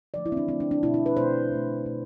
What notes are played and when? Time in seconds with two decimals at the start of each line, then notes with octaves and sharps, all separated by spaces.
0.14 D3 F3 A3 D5
0.26 E4
0.32 C4
0.37 D4
0.48 D3 F3 A3 C4
0.60 D4
0.71 D4
0.83 B2 A3 E4
0.94 E4
1.06 B4
1.17 B2 A3 C5
1.51 B2 A3
1.86 B2 A3